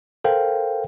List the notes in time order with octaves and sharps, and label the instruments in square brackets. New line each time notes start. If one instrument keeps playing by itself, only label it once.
[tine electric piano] A4 A#4 C5 F5 G5